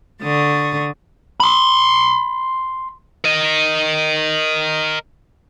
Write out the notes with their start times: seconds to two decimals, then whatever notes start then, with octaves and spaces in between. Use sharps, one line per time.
0.23 D3 C#6 D#6 A6
1.40 B5 C6
3.24 A#4 D#5